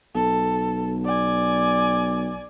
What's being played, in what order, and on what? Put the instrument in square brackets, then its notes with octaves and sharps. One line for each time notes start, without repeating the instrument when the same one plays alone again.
[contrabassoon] B1 [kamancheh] A4
[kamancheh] D5 G#5